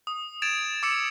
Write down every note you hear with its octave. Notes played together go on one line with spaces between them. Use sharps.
D#6
G#6 A6 D7 E7 F7
D6 E6 C#7